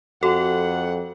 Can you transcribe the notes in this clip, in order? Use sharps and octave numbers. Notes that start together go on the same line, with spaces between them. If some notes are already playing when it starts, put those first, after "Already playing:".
F2 F#4 A4 F#5 A#5